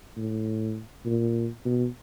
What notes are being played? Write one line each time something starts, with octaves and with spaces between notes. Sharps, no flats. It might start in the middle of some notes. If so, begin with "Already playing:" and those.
A2
A#2
B2